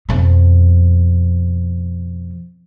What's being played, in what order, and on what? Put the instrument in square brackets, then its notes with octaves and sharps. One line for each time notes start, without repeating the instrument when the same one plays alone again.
[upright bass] F2 B2